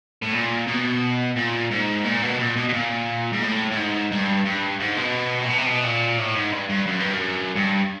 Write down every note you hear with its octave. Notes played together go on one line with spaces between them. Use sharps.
A2
A#2
B2
A#2
G#2
A#2
B2
A#2
B2
B2
A#2
G#2
A2
A2
G#2
G2
G2
G#2
B2
A#2
B2
C3
B2
A#2
A2
G#2
G2
G2
F#2
G2
F#2
G2